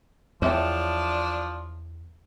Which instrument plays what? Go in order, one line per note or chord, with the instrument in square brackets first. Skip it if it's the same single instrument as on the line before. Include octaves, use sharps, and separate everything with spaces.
[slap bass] E2 [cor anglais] F3 [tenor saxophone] D4 [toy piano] C#5 E5 G5